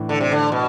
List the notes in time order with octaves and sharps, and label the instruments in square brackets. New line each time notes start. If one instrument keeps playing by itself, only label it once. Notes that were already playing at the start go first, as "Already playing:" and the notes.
Already playing: [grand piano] A2 E3 A3 D4
[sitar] D3
C3
D3
B2